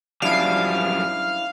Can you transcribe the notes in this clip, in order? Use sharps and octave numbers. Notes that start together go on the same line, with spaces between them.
F#2 F3 G3 D4 E4 F5